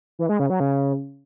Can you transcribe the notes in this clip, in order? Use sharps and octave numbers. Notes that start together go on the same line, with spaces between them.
E3
G#3
C#3
F#3
C#3